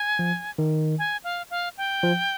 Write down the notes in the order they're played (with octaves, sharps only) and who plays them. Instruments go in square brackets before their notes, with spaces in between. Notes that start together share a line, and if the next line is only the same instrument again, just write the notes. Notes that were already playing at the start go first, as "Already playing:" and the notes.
Already playing: [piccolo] G#5
[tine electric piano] F3
D#3
[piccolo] G#5
F5
F5
G5
[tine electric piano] F3